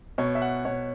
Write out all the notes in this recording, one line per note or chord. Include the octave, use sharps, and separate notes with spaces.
B2 C#5
E5
F#5
B2 C#5